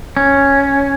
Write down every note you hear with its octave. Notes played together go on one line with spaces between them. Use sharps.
C#4